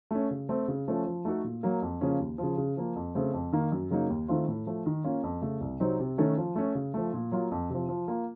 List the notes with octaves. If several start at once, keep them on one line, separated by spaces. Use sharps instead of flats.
A3 C#4
C#3
A3 C4
C#3
F3 A3 C#4 A4
F3
A3 D#4 F#4 A4
A#2
F#3 A#3
F2
C#3 F3 A#3 C#4
D#2
C#3 F3
C#3
F3 A#3
F2
C#3 A3 C4
F2
D#3 A#3
F#2
C#3 F#3 A#3 D#4
D#2
D#3 A3 C4 F4
A2
F3 A3
D#3
A#3 C#4 F4
F2
C#3 A3
C2
C3 F#3 C4 D#4
C3
D#3 A3 C#4 A4
F3
A3 C#4
C#3
F3 A3
A#2
F#3 A#3 F4
F2
C3 F3
F3
A#3 F4